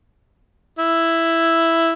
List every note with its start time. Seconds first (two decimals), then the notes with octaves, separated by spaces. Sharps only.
0.79 E4